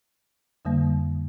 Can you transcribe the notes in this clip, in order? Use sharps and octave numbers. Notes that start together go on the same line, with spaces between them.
F2 D3 G3 A#3